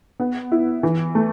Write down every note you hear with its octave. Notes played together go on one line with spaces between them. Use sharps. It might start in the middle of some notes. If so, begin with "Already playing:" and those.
B3
E4
E3
A3